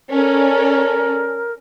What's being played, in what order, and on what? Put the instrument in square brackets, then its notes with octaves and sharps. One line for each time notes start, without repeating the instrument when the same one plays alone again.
[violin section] C#4 A4 D5 [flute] A#4